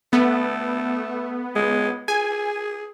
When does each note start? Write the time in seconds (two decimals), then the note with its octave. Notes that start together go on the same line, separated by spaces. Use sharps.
0.13 A3 B3
1.56 G#3
2.08 G#4 G#5